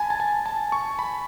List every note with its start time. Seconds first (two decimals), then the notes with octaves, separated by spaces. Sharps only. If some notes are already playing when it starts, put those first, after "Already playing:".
Already playing: G#5 A5 B5
0.10 A5
0.20 G#5
0.46 A5
0.72 C#6
0.99 B5